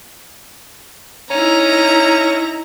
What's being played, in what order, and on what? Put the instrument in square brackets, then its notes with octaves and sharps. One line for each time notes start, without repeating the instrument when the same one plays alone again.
[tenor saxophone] C#4 [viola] D#4 E4 [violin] A#5